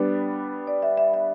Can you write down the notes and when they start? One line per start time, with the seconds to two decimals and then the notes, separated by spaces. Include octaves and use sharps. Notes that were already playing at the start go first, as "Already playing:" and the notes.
Already playing: G3 B3 D4
0.67 D5
0.82 E5
0.97 E5
1.14 E5